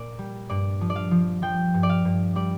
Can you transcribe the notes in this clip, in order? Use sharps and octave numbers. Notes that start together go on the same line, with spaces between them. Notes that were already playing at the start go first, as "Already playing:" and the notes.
Already playing: A#2 D5
G3
G2 D5
F3
D5
F5
F3
F3 G5
G2
D5
F5
G2
G3 D5